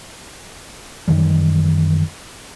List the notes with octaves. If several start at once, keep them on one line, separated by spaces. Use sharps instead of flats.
F#2 D#3 E3 G3